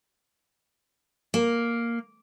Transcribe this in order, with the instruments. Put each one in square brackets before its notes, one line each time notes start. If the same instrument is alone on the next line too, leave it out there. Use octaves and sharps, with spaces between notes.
[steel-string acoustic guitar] A#3